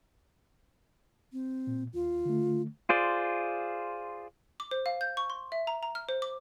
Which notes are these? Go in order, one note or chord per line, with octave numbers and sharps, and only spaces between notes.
C4
A#2
D#2 F4
D3 A3
F4 G#4 C5 D5
D6
C5
F5
G6
C#6
C6
E5
A#5
A#5
F6
C5
D6